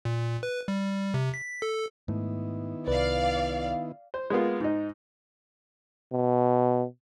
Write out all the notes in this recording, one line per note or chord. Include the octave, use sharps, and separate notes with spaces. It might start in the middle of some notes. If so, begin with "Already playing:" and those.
A#2
B4
G3
C3
B6
A4
G#2 D#3 A3 B3 E4
C2 B4 D5 F5
C5
G#3 A#3 B3 F4
G#2 D#4
B2